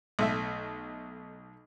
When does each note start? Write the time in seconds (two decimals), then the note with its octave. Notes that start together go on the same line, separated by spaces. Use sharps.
0.19 B1 A3 E5